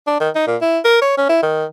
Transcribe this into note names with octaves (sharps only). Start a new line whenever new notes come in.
D4
D#3
D#4
A#2
E4
A#4
C#5
C#4
E4
D#3